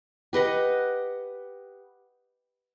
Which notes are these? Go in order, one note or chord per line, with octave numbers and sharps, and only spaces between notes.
G4 B4 D#5 F#5